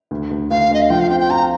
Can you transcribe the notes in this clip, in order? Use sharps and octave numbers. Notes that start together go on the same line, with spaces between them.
D2
D2
D2 F5
D2 D#5
F5
F3 G5
F5
C4 G5
G5
F4 A#5